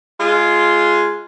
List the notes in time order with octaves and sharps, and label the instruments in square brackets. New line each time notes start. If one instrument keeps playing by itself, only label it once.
[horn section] G#3 F4